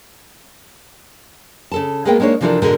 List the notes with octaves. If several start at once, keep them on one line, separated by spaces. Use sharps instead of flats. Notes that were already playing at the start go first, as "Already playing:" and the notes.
C#3 A4 A5
G#3 A#3 B3 G#4 G5
G#3 A#3 D4 D#4 C#5
C3 E3 F3 D4 A4 A#4
G#2 B2 D3 G#3 A#4